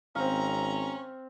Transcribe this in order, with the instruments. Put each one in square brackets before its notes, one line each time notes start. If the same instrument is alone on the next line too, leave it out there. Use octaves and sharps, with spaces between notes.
[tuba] G#1 [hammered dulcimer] C4 F5 [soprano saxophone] C#4 [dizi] A#5